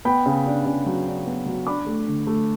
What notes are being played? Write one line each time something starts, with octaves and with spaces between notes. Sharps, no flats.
B3 G5 B5
C#3
D4
C#3
F#3
D4
B3
F#3
D4 B5 D6
A3
D3
A3